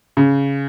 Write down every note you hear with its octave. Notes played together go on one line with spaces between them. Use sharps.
C#3